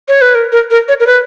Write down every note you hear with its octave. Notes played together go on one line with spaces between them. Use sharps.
C#5
B4
A#4
A#4
A#4
C#5
A#4
B4